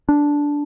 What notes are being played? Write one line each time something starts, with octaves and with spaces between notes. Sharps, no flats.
D4